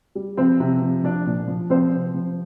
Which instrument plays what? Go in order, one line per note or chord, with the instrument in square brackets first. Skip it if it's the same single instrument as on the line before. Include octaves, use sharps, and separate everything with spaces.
[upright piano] G3
F3 C4 C5
C3
F3
F3 D4 D5
A#2
F3
F3 C4 C5
C3
F3